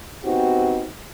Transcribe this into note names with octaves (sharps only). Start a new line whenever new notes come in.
B3 C4 D#4 F#4 G4